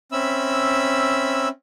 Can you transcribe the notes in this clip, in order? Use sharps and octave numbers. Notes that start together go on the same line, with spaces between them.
C4 C#4 E5 B5 E6